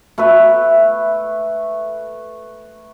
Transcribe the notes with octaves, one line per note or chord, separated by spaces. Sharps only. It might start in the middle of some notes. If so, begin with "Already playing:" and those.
A3 B4 E5